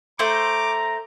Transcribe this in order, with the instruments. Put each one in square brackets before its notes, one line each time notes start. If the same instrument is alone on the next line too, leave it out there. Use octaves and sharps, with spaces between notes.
[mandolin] A3 C5 [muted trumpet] A#5 [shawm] D6